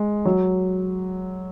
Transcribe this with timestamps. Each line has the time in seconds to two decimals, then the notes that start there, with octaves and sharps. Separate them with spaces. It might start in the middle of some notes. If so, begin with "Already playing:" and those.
Already playing: G#3
0.25 F#3